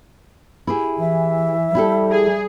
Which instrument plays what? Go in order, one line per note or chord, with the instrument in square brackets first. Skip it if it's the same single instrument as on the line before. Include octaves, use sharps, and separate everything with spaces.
[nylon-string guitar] E4 G4 G#4
[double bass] E3 [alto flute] E5
[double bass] G3 [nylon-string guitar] E4 G4 A4
[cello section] G#4